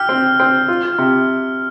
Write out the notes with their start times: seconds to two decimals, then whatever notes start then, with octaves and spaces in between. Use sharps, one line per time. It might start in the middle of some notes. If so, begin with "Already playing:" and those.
Already playing: G4 F6
0.09 C4
0.39 C4
0.68 F4
0.98 C3